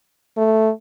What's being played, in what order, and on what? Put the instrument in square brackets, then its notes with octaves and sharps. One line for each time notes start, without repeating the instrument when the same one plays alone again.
[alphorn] A3